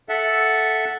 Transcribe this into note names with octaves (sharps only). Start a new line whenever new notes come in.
A4 E5 F#5